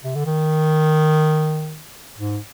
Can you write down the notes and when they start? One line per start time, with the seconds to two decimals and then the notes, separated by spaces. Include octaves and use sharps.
0.04 C3
0.15 D3
0.26 D#3
2.18 G#2